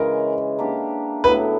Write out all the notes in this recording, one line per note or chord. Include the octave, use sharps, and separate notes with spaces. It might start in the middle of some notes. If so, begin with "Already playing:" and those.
Already playing: C#3 E3 G#3 A#4
A#3 D4 G4
A2 F#3 B3 E4 B4